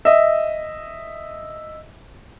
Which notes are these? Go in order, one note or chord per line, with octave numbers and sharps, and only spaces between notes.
D#5 E5